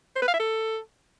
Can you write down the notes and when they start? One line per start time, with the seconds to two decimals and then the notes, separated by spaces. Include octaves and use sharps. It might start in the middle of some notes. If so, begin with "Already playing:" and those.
0.16 C5
0.22 B4
0.28 F5
0.34 E5
0.40 A4